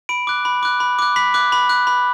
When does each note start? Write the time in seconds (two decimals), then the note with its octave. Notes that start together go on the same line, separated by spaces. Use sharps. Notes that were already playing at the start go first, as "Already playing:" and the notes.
0.09 B5 D7
0.27 D6 F#6
0.45 B5
0.63 D6 F#6
0.80 B5
0.99 D6 F#6
1.16 B5 B6
1.34 D6 F#6
1.52 B5
1.69 F#6
1.87 B5